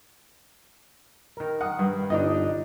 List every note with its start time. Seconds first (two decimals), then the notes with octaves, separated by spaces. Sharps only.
1.37 D#3 A#4
1.61 F#5 D#6
1.79 G2
2.10 G1 D4 D#4 D#5